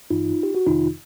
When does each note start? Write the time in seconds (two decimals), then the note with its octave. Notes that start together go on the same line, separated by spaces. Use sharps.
0.10 G2 E3 D#4 F4
0.43 G4
0.55 F#4
0.66 F2 C3 D#3 D#4 F4